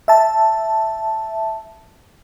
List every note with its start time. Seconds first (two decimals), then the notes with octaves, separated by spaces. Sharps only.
0.08 E5 A5